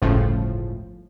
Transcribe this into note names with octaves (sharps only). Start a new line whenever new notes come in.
G1 C#2 A2 C#3 F3